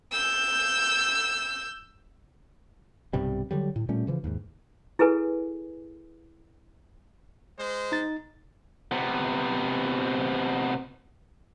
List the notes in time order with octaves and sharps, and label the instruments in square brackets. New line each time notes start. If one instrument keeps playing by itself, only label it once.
[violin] E6 G6
[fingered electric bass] B1 G2 C3 G3
D3 F#3 G3
A2
A#2 G3 A3 C#4
C#3 E3 F3
D#2 G#2
[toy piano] E4 G#4 A4 B4 G#5
[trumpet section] G#3 C5
[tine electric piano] D#4 A6
[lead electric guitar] C3 B3